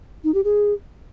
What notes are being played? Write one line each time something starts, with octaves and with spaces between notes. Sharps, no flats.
D#4
G4
G#4